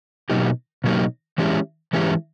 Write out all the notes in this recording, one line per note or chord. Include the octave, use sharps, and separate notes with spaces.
B2 F#3 A#3 D#4 G4
B2 F#3 A#3 D#4 G4
E3 G#3 C#4 E4 G4
E3 G#3 C#4 E4 G4